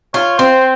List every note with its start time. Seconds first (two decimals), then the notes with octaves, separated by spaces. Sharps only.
0.14 F4 C#5
0.39 C4 C5